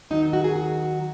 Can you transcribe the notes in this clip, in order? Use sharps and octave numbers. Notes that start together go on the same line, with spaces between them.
D#2 D#3 F#3 D#4
F#4
G#4
F#4